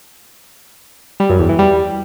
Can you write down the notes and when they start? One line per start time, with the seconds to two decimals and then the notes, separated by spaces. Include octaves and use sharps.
1.20 G3
1.30 F#2
1.39 E2
1.49 E3
1.59 G3